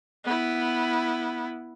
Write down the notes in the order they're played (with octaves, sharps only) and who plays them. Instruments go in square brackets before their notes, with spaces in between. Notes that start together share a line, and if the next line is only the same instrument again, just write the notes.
[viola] B3 E4